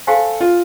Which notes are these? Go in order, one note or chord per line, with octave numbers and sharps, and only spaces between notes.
G4 A4 C5 F5 G#5 C6
F4